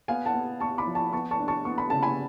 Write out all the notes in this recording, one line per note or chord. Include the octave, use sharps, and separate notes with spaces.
B3 F5 G#5
F#5 A5
B3
B3 A5 C#6
B5 D6
F3
A5 C#6
B3 A5 C#6
A5 C#6
D4
A5 C#6
B3 C#6
B5
C#3 A5
G#5 B5